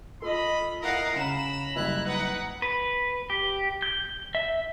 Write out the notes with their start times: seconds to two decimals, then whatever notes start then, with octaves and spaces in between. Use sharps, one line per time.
0.22 F4 A4 D#5 B5
0.81 E4 A#4 D#5 F5 F#5
1.16 C#3 C#4 A#5 B5 E7
1.76 F#1 G3 E4 F#6 B6
2.05 D#4 B4 F#5
2.62 B4
3.30 G4
3.82 G6
4.35 E5